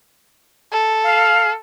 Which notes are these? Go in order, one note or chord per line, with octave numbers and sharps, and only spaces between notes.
A4
F5